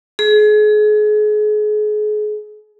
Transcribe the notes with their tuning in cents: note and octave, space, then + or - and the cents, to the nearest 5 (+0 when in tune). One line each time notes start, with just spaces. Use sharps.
G#4 +35